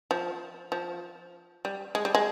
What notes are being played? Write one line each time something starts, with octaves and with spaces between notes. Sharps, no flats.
F3
F3
G3
G#3
G3
G#3